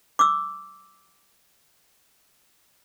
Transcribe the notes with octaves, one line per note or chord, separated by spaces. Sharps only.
D6 E6